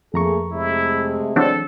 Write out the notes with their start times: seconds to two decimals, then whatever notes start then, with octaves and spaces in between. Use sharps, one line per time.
0.14 F2 A3 A#3 G#4 A#5 C#6
0.52 C3 G#3 A3 E4
1.36 E3 F#3 C4 D4 A4